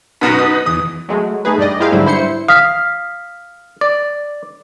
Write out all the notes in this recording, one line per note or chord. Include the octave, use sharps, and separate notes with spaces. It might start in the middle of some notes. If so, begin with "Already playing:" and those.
F#2 B2 F#3 D#4 B4
D#6
E2 D#6
F#3 G#3 A3
A3 D#4 G#4 B4
G2 G3 D5 D#5
E4 G4 G#4 A#4 C5 F5
G#2 D3 F#3 G3 E4
G2 E4 C5 C6 C#7
F5 D#6 F6 B6
D5